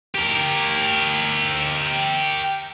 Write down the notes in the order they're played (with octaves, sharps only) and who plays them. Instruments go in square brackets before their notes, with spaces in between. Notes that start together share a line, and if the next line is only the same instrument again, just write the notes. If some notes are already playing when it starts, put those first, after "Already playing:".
[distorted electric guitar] G4 A#4